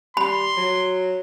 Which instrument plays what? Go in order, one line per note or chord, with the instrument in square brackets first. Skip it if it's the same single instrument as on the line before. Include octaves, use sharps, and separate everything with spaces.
[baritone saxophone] G3 [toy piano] B5 [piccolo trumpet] C6
[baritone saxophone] F#3